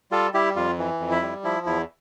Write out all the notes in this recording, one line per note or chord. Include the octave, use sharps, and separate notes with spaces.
G3 F4 A4
G3 E4 G4
F2 F4
E3
F2
E4
G3
F3 E4
E2 E4